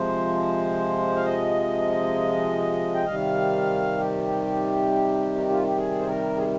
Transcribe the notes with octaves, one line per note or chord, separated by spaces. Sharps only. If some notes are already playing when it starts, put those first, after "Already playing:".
Already playing: C3 F3 G#3 C5
F5
D#5
G5
C3 D#3 G3 F5
G4
D#4
F4
G4
G#4
C5
A#4
G#4